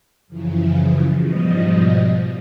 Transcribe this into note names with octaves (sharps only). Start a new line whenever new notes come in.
F#2 C#3 E3 F3
G#2 B2 F3 G3 D#5